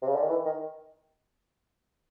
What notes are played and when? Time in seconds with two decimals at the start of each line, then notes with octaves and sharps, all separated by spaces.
0.02 C3
0.08 C#3
0.15 D3
0.23 D#3
0.30 E3
0.46 D#3